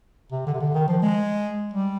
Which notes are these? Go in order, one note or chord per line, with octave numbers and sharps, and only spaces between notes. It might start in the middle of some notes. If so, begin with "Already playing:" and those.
C3
D3
C3
D3
D#3
F3
G#3
G3